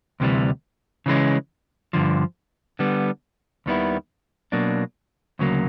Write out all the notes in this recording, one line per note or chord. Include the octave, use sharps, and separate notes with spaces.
D2 C3 E3 G3
C#3 E3 G#3 C#4
G2 D3 F3
D3 G3 B3
D#2 D#3 G3 B3 E4
B2 F#3 A#3 D4
D2 C#3 F#3 A#3